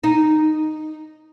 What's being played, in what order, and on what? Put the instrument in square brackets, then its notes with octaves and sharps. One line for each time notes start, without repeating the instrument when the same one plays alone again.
[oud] D#4